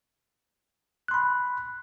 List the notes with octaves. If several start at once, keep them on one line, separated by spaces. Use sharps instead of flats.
B5 C6 F#6